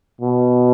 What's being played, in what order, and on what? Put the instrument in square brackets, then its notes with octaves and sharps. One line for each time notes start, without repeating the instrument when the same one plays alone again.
[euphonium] B2